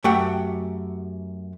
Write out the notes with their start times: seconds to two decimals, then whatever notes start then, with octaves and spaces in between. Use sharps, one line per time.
0.04 F#2 A3 G4 F#5 G5